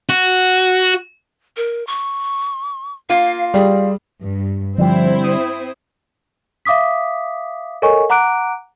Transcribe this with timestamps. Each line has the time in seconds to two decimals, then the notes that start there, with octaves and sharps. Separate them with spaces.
0.09 F#4
1.57 A#4
1.87 C#6
3.09 A#3 F4 F5
3.54 G3 G#4
4.21 G2
4.78 D3 F3 G3 C4 E4 C5
5.24 D#6
6.65 E5 F5 D6 D#6 B6
7.82 A4 A#4 C#5 D#5 G#5 C#6
8.10 F#5 A#5 D6 F#6 D7